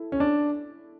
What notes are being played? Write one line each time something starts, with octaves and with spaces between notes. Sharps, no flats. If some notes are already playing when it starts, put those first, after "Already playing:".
Already playing: E4 A4
C#4
D4